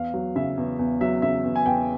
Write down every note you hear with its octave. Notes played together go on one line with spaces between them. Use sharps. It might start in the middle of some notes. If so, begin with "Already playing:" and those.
Already playing: E2 F5
F#3
C#3 E5
E2
E2
F#3 E5
C#3 E5
E2
G#5
E2 G5